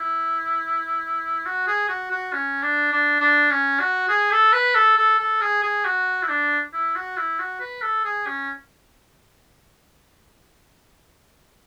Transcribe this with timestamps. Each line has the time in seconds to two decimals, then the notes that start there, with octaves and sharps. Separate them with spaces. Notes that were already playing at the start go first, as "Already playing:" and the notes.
Already playing: E4
1.45 F#4
1.67 G#4
1.89 F#4
2.11 F#4
2.33 C#4
2.62 D4
2.92 D4
3.20 D4
3.50 C#4
3.80 F#4
4.08 G#4
4.31 A4
4.53 B4
4.75 A4
4.97 A4
5.19 A4
5.41 G#4
5.63 G#4
5.85 F#4
6.23 E4
6.29 D4
6.73 E4
6.95 F#4
7.17 E4
7.39 F#4
7.60 B4
7.82 A4
8.05 G#4
8.26 C#4